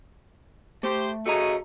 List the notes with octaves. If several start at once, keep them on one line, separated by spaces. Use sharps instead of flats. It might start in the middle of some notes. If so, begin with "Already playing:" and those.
A3 G4 C5
C#3 A3 F#4 G#4 D#5 A#5